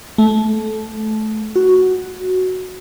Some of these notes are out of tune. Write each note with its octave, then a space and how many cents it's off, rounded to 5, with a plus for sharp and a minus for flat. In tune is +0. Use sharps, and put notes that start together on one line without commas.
A3 -20
F#4 +0